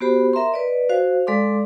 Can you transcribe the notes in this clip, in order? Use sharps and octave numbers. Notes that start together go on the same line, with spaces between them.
B3 F#4 G4 C5 B5
A#4 E5 A#5 C6
B4 D5 D#5
F#4 C5 F5
G#3 A4 D5 F5 C6 D6